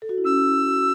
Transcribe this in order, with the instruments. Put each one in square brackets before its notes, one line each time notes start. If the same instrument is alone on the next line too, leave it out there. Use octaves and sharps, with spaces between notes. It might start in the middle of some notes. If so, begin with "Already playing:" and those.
[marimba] A4
F#4
E4
[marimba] C#4 [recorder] E6
[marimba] E4
F#4